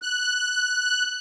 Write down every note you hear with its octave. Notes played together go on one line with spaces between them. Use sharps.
F#6